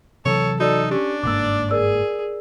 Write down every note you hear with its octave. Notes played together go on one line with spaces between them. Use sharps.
C3 E3 F#3 A4 C#5
D#4 F#4 A4 D5
C#4 D4 G4
G1 G#2 A#3 D5 D6 E6
G#4 A#4 D5 E6